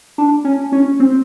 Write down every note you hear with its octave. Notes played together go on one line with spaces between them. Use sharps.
D4
C#4
C#4
C4